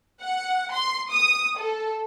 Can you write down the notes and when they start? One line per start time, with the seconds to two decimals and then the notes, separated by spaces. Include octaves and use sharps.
0.21 F#5
0.72 C6
1.10 D#6
1.58 A4